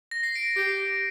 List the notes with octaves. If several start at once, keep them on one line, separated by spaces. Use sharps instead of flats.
A#6
C7
D7
G4 C7